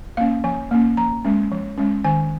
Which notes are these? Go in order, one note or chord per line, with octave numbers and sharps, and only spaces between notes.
A#3 C#4 F5
F3 G#5
A#3 C#4
F3 A#5
G#3 C#4
F3
G#3 C#4
D#3 G#5